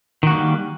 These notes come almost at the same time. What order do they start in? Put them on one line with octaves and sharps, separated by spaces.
D#3 F#4 A#3 G3